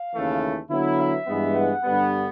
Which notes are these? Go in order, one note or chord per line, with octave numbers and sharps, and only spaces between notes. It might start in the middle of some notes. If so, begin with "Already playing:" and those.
Already playing: F5
D#2 C#3 E3 A3
D3 F#3 B3 E4
E5
G2 E3 G#3 B3
F#5
G2 D3 G3 B3